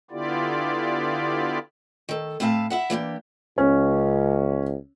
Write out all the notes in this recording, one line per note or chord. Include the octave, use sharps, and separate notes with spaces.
D3 B3 E4 F4 G4 D5
D#3 A4
A2 C4 E4 F5 A5
E4 E5 F#5
E3 A#3 D4 G4
C#2 C#4